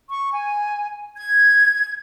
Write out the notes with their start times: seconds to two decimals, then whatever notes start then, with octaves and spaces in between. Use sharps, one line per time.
0.09 C#6
0.31 G#5
1.17 G#6